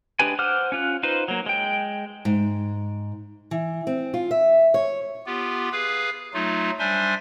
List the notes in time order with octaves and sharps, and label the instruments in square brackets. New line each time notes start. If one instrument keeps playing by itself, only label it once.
[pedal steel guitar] G#3 D4 G4 B4 G#5
C5 F#5 D6 F6 F#6
C#4 F4 F#6
D#4 F4 B4 C5
F#3 A#3
G#3 G5
[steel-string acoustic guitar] G#2
E3
C4
F4
E5
C#5
[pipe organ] B3 F4 G4
G#4 B4 F5
F#3 A3 D#4 F4
G3 D4 C5 E5 G#5 C6